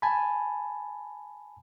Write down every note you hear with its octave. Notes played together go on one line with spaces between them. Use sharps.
G#5 A5 B5